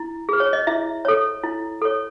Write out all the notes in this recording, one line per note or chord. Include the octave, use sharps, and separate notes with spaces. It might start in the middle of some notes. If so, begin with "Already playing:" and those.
Already playing: E4
G#4 B4
C#5
D#5
E4 E5
A4 C#5
E4
A4 C#5